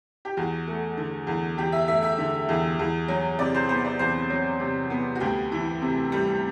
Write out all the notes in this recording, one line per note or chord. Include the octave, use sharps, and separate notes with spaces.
G4
E2 F#4
A3
D3
E2
E2 G4
E5
A3 E5
E5
D3
E2
E2
F#3
C3 D5
C5
B3 C5
D5
E2 C5
F#3
C3
B3
F#4
D2 G4
E3
C3
G3